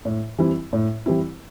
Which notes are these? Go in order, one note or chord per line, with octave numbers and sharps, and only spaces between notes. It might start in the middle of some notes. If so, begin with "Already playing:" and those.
A2
E3 G3 C4 E4
A2
E3 G3 C4 E4